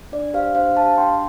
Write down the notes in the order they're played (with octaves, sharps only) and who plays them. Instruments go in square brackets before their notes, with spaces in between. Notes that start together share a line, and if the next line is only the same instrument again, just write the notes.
[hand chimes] D4 D5
G4 C5 F5
D4 C5 F5
G4 F5 A5
D4 G5 C6